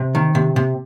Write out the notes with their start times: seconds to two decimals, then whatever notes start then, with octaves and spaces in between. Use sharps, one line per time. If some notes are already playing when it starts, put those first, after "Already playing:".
Already playing: C3
0.15 D#3
0.35 C3
0.56 C3